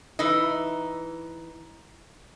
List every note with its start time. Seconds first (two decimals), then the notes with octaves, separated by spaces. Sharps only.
0.19 E3 D#4